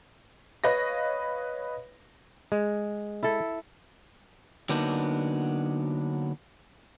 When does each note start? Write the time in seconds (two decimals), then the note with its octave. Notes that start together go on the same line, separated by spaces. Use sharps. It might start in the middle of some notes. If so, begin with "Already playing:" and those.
0.64 B4 C#5 D#5 F5 A#6
2.52 G#3
3.23 E4 A4
4.69 D3 F#3 A#3 B3 D4 D#4